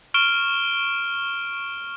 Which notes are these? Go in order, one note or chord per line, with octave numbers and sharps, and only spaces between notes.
C#6 F6 D7 E7 G7